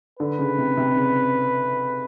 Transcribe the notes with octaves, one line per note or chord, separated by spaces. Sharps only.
D3 B4
C#3
C3
C3
C#3